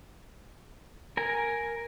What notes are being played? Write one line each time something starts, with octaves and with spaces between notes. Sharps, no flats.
A#4 G#5